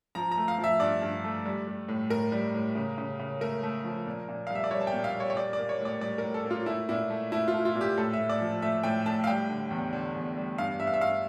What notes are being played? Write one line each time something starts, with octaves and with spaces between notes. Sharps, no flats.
F3 A#5
A#5
A3
F5
F3
E5
G2 D5
G2
A3
G3
G3
A2
A2 A#4
G3
A2
C#3
C#3
C#3
A3 A#4
A3
F3
A#2
A#2
F5
G3 E5
D5
G3 C#5
A5
G5
A#2
F5
G3 C#5
C#5
A#3 D5
D5
A#3
C#5
A2 D5
G3 D5
A#4
A2
A4
A#3
F4
A3 E4
A#2 E4
A3
A3 E4
F4
A3
F4
A#2
G4
A2 A4
E5
A2
D5
F3
A3 E5
A2 G5
A2 A5
F5
G3 G5
D3
E2
D3
E2
G3
G2 F5
G2 E5
F5
E5
G2 F5